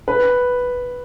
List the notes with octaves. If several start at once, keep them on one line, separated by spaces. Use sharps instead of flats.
B4